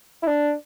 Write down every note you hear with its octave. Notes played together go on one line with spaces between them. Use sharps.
E4
D4